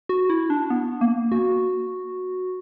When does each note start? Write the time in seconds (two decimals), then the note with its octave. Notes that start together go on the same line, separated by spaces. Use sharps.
0.09 F#4
0.30 E4
0.50 D4
0.70 B3
1.01 A#3
1.32 F#4